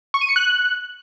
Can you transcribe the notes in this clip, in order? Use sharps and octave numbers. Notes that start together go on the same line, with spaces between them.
C#6
D#7
C#7
F#6